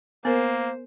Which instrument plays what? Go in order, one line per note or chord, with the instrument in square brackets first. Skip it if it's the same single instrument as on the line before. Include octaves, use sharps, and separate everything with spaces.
[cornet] A#3 [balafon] B3 A#4 [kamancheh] C5